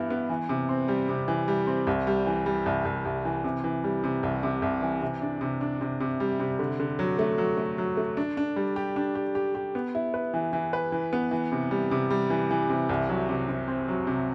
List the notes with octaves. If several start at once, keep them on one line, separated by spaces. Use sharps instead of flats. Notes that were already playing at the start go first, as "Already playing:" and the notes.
Already playing: G2 E3 B3 E4
B3
E3
C3
C4
G3
C3
E3
G3
C4
C2
G3
E3
G3
C2
C2
C2
E3
C3
E3
G3
C3
C2
C3
C2
E3
C3
D4
C3
D4
C3
C3
G3
C3
D3
D3
F#3
A3
F#3
A3
F#3
A3
D4
D4
G3
G4
D4
G4
G4
G4
B3
E4
B4
E3
E3
B4
E3
B3
E3
C3
G3
C3
G3
E3
E3
C3
C2
F#3
C3
C3
C4
F#3
C3